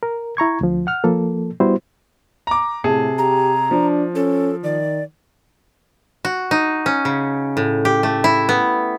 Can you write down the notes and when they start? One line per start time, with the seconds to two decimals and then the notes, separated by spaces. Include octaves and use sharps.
0.03 A#4
0.37 E4 A#5 C#6 G#6
0.61 D2 F3
0.87 F#5 F6
1.04 F3 A#3 A4
1.60 G3 B3 E4 F#4 C5
2.47 A#5 D6
2.84 A2 C3 G#4 A5
3.18 G4 A#5
3.71 F3 D4
4.15 C#4 A4
4.63 D#3 D5
6.25 F#4
6.51 D#4
6.86 C#4
7.05 C#3
7.57 A2
7.85 G4
8.03 A3
8.24 E4
8.49 B3